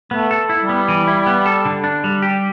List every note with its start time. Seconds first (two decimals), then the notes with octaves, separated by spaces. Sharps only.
0.11 A3 B3
0.31 A4
0.49 E4
0.63 G3
0.69 B3
0.88 E3
1.07 E4
1.27 B3
1.46 A4
1.65 D3
1.84 D4
2.04 G3
2.22 G4